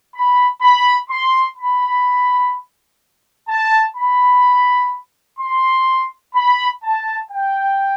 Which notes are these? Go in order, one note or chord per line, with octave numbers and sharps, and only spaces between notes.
B5
B5
C6
B5
A5
B5
C6
B5
A5
G5